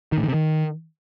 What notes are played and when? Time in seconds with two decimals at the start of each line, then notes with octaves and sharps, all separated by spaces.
0.12 D#3
0.18 A2
0.23 D#3
0.28 C3
0.34 D#3